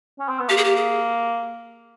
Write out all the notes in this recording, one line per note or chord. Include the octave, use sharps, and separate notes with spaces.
C#4
C4
B3
A#3 G4
G#4
G4
G#4